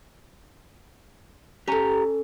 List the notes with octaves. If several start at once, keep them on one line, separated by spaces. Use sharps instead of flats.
C#4 G4 A4 A#5